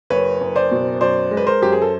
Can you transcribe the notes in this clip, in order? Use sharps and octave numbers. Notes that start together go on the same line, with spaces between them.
F#1 B4 C#5
F#1
C5 D5
B2
F#2 C5 D5
G#3
B4
A#4 C5
F#2 G4
G#4
A4